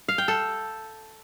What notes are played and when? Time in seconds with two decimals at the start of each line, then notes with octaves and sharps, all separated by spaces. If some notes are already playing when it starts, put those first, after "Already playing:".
0.08 F5
0.18 G5
0.28 A4